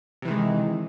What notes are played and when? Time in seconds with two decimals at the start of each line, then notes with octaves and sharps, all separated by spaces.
0.22 C3
0.25 E3
0.28 D#3
0.31 G#3